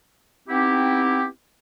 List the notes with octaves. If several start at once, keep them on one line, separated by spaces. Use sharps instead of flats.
B3 C4 D#4 E4 G4